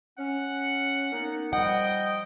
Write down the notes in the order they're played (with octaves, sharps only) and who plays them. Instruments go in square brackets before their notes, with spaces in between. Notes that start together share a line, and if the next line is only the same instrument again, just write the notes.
[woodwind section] C#4 [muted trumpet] F#5
[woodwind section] A#3 B3 D#4
[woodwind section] F3 G3 [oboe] D#5 [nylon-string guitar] F#5 [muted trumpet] G5